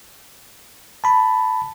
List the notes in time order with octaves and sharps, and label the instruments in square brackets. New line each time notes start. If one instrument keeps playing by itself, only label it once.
[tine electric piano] A5 B5